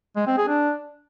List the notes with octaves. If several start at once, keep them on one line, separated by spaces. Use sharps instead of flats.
G#3
C4
G#4
D4